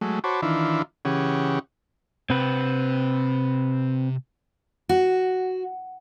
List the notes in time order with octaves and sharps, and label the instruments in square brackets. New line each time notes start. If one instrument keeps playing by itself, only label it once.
[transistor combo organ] F#3 G#3 A3
F#4 C5 C#5 A5 B5 D6
D#3 E3 D4 E4 F4
C#3 E3 C#4 G4 G#4 F#5
[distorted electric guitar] C3 [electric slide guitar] C4 B4
[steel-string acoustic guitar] F#4